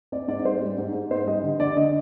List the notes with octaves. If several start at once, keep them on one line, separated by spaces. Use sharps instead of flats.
C4 D5
G#2 D5
G3 C5
G3
G#2
G#2
B3 C5
G3 D#5
D3
D3 D5
D3 D#5